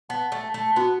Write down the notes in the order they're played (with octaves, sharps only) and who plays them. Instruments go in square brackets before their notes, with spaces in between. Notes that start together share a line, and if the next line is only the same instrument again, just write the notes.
[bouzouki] B3 [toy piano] A5
[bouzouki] A3
[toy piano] A5
[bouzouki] A3
[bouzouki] B3 [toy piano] F#4